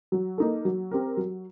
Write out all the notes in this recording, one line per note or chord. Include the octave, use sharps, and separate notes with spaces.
F#3
A#3 D#4 A4
F#3
C4 G4 A#4
F#3